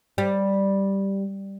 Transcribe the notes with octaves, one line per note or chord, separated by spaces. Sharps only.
G3